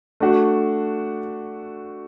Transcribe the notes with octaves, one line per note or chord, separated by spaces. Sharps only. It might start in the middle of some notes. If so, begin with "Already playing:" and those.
A3 D4 F#4